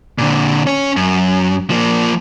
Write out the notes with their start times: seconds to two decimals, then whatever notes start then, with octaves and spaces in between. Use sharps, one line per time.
0.19 A#2 D3
0.67 C#4 C#5
0.96 F#2
1.70 F3 A#3